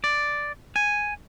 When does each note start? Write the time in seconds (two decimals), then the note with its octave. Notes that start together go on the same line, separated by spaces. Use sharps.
0.04 D5
0.76 G#5